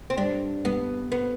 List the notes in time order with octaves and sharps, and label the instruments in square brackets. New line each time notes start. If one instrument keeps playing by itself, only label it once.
[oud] C4
[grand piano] G2 [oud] D4
[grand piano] G2 [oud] B3
[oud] B3